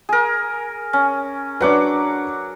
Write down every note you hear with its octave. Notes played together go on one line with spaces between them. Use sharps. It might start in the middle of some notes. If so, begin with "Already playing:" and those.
G#4 A#4
C#4
F#3 D4 B4 F#5 D6